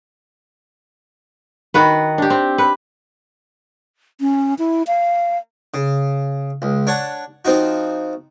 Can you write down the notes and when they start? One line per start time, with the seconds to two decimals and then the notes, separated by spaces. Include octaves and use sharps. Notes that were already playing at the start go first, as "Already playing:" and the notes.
1.74 D#3 F#4 B4
2.18 D4 G4
2.30 C4
2.58 B4
4.21 C#4
4.59 E4
4.87 F5
5.74 C#3
6.62 C#2
6.87 D4 C#5 F#5 A5
7.45 F3 C4 D#4 F#4